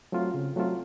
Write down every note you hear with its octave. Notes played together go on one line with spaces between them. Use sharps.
F#3 A3 C4 F4
C#3
F#3 A3 C4 F4